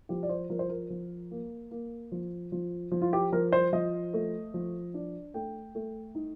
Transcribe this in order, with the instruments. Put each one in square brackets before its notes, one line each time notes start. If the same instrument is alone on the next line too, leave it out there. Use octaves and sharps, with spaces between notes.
[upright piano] F3 G4
D5
C5
F3 A#4
C5
A#4
F3
A#3
A#3
F3
F3
F3
F4
G4
F3 A#4
C5
F3 D#5
A3
F3
D4
A3 G5
A3
D#4